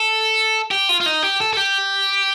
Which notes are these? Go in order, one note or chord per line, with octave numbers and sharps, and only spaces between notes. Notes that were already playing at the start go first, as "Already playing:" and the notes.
Already playing: A4
G4
F4
F4
D#4
G4
A4
A4
G4